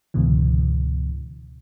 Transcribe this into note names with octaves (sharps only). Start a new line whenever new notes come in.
C#2 G#2 B2 D3 E3